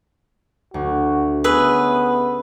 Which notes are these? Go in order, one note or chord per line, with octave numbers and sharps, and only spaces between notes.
D2 F#4
B3 C#4 G#4 B4 E5